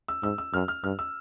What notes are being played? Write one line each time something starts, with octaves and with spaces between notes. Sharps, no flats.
E6
G#2 E6
E6
F#2 F6
F6
G2 F6
E6